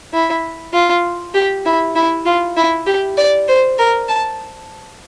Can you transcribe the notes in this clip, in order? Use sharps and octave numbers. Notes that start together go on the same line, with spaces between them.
E4
F4
G4
E4
E4
F4
E4
G4
D5
C5
A#4
A5